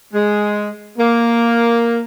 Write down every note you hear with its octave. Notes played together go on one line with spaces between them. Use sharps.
G#3
A#3